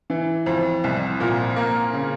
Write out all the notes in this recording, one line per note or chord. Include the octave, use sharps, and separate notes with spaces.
E3
F2
C2
A#2
A#3
C#3